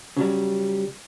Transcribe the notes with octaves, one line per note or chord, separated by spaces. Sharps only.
C#3 F#3 G3